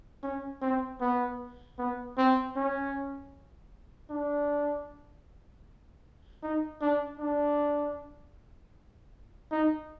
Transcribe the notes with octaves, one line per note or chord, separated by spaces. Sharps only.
C#4
C4
B3
B3
C4
C#4
D4
D#4
D4
D4
D#4